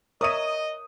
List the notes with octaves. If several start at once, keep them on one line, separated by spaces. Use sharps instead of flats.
A#4 C#5 D#5 E5 D#6 D#7